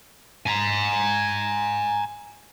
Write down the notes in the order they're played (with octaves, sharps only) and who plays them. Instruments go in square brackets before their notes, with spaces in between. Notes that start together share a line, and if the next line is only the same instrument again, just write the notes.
[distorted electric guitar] G#5 A#5